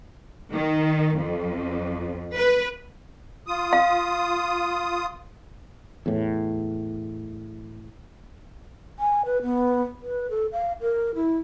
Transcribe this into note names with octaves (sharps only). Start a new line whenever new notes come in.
D#3
F2
B4
F4 D#6
F5
E2 A2
G#5
B4
B3
B4
A4
F5
A#4
E4